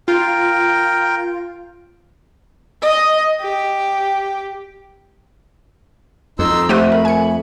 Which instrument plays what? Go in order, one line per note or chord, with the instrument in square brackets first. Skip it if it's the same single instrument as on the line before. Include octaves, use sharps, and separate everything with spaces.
[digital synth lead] F4 [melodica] A#4 G5
[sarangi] D#5
G4
[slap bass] F2 [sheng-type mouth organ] D#4 C6 E6
[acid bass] A3 [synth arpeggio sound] G4 C5 D#7 [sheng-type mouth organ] F#5
[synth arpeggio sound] A#4 [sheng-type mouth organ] B5
[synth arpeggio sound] G#5 C#7